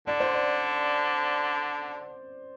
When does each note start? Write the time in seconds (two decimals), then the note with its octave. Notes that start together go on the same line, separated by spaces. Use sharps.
0.07 D3 D5
0.20 C5
0.34 D5